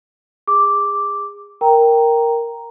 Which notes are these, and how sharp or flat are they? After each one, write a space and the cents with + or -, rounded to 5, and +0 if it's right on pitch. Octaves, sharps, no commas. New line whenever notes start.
G#4 -25 D6 +0
A#4 +0 G5 +0 A#5 +0